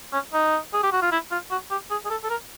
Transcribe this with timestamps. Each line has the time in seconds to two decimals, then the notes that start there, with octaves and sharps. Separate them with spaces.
0.13 C#4
0.33 D#4
0.74 G#4
0.83 G4
0.92 F#4
1.02 F4
1.12 E4
1.31 F4
1.51 F#4
1.71 G4
1.91 G#4
2.05 G#4
2.10 A4
2.24 A4
2.30 A#4